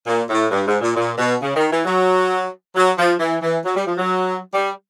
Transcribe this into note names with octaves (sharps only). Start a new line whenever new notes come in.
A#2
A2
G2
G#2
A#2
A#2
B2
C#3
D#3
E3
F#3
F#3
F3
E3
E3
F#3
G3
F3
F#3
G3